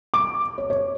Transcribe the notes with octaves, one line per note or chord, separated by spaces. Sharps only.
D6
C#5
C#5